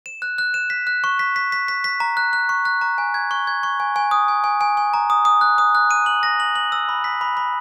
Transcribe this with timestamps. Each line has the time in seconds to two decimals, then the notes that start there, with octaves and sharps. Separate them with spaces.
0.06 E7
0.22 F#6
0.38 F#6
0.54 E7
0.70 B6
0.87 F#6
1.04 C#6
1.19 B6
1.36 B6
1.52 B6
1.68 B6
1.84 B6
2.00 A#5
2.17 F#6
2.33 F#6
2.49 C#6
2.65 F#6
2.81 A#5
2.98 G#5
3.14 G#6
3.31 C#6
3.47 G#6
3.63 C#6
3.80 G#5
3.96 G#5
4.11 D#6
4.28 G#5
4.44 G#5
4.61 G#5
4.77 G#5
4.94 A#5
5.10 D#6
5.25 D#6
5.41 F#6
5.58 D#6
5.75 F#6
5.91 D#7
6.06 F#7
6.23 A#6
6.40 F#7
6.56 F#7
6.72 E6
6.89 B5
7.04 B6
7.21 B5
7.37 B5